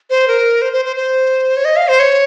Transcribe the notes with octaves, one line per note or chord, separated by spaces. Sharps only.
C5
A#4
C5
C5
C5
C5
C#5
D#5
F5
C5
C#5